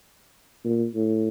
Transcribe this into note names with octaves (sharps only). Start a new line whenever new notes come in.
A#2
A2